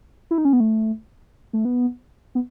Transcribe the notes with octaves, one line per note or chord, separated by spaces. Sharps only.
E4
D#4
C#4
B3
A3
A3
B3
B3